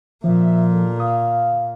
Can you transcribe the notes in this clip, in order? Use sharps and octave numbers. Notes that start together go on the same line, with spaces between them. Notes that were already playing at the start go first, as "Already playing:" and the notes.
A#2 F3 E5
G2 B2 A4
F5 D#6